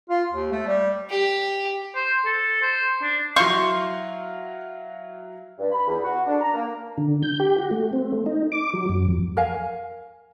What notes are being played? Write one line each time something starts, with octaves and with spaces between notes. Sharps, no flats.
F4
D#2
A3
G3
G4
C5
A4
C5
D4
F#3 E4 C5 F5 C6 C#6
G2
B5
E2
F#4
D4
A#5
A#3
D3
G6
G4
F#4
A3
C4
A3
D#4
D6
F#3
F#2
F2
A#4 F5 G#5